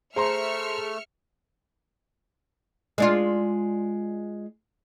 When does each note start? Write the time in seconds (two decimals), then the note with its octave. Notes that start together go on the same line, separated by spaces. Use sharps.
0.16 A3 G#4 C5 E5 A#5 C6 F6 C#7
2.98 G#3 D4 F4